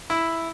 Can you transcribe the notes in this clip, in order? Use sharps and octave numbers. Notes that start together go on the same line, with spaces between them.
E4